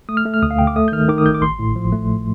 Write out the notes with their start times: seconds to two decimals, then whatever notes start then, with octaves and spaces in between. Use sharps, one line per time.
0.09 A3 D#6
0.17 F6
0.26 A3
0.34 F6
0.42 D2 D#6
0.51 F5
0.59 D2 G5
0.67 D6
0.76 A3 D#6
0.88 G6
0.92 D#3 F6
1.09 D#3 D6
1.18 D#6
1.26 G1 G6
1.34 D6
1.42 A1 C6
1.59 A2
1.76 F3
1.92 A3